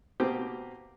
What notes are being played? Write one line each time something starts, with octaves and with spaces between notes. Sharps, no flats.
B2 A#3 C4 G4